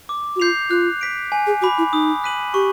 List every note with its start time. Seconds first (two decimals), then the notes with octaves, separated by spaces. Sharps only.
0.09 D6
0.36 F#4
0.40 F4 G6 C7 F7
0.70 F4 F#6
1.01 B6 D7
1.32 G#5
1.47 G#4
1.62 F#4 B5 D6
1.78 E4
1.93 D#4 D#6
2.24 F#6 B6 D#7 F#7
2.54 G4 C#6